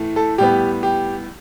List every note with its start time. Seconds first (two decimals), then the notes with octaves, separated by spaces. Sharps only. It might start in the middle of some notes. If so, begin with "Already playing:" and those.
Already playing: A2 E3 A3
0.16 A4
0.38 A2 G3 B3 G4
0.83 G4